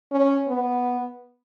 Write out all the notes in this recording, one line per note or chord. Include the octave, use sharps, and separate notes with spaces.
C#4
B3